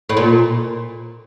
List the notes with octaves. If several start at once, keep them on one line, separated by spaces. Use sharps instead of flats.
A2
A#2